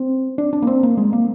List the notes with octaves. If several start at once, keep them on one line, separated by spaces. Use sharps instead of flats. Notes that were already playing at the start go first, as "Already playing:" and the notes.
Already playing: C4
D4
D4
A#3
C4
A#3
G#3
A#3